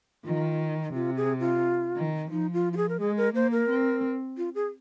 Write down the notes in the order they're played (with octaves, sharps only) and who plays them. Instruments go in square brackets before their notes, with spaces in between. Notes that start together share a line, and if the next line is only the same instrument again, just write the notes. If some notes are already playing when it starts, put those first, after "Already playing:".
[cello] D#3 [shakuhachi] F4
[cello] C3 [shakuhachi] F4
[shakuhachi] G#4
F4
[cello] D#3
[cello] F3 [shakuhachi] D#4
[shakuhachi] F4
F4
G#4
A#4
[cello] G#3 [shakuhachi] G#4
[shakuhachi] A#4
[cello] A#3 [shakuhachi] C5
[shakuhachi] A#4
[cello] C4
[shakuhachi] F4
G#4